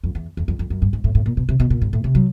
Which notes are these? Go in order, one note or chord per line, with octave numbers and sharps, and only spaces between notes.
F2
E2
E2
F2
F2
F#2
G2
G#2
A2
A2
A#2
B2
C3
B2
A#2
G#2
A2
C3
F#3